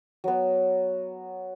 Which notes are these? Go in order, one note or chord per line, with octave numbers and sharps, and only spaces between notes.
F#3 B3